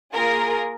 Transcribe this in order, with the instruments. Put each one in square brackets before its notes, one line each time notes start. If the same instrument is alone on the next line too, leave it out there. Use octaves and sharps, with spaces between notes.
[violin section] A#3 F4 G#4 A#4